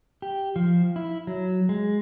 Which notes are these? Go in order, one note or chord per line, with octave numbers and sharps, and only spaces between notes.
G4
F3
E4
F#3
G#3